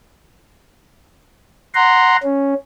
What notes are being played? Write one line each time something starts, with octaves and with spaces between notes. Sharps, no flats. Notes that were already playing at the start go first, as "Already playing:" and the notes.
F#5 A#5 C6
C#4